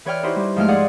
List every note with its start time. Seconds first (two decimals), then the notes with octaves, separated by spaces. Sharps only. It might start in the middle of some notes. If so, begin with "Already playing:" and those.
0.05 E3 B4 C#5 D5 G5 F6
0.23 D#4 E4 F#4 G4 B4 C5
0.36 G3
0.56 G#2 F3 G#3 A3 G5 F6
0.68 G#4 C5 D5 F5 F#5 D#6